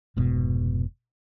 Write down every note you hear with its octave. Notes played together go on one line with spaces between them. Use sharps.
F1 G#2 B2